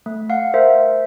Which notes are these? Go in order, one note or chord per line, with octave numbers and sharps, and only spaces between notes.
A3
F5 F#5
A#4 C5 E5